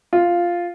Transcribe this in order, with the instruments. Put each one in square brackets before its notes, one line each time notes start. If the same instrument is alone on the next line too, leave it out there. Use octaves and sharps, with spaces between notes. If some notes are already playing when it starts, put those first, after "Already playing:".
[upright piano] F4